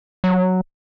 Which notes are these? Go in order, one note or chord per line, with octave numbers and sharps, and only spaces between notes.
F#3